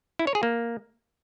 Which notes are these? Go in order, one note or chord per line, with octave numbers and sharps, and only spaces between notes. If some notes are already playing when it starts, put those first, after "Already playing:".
E4
C#5
G#4
A#3